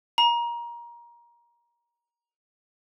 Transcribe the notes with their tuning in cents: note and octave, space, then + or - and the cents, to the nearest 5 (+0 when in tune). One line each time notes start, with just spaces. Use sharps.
A#5 +20